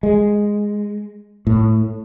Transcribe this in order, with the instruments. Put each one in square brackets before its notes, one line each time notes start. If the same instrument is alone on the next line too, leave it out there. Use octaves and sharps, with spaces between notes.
[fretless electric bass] G#3
A2